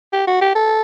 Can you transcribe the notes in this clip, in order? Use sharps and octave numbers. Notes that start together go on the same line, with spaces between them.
G4
F#4
G4
A4